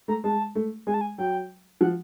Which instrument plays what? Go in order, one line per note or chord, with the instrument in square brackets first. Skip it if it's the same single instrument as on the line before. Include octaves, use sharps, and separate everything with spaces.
[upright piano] A3 [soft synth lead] A#5
[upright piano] G#3 [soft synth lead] A5
[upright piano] A3
[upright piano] G#3 [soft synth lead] G#5
[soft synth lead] A5
G#5
[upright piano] F#3 [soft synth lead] G5
[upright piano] F3 [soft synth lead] F#5